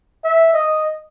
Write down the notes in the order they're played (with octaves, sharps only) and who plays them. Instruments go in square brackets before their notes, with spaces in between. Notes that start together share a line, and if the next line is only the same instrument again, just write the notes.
[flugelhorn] E5
D#5